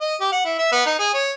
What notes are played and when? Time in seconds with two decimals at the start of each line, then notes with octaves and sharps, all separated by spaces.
0.01 D#5
0.20 G4
0.32 F#5
0.45 E4
0.59 E5
0.72 B3
0.86 D#4
0.99 G#4
1.14 C#5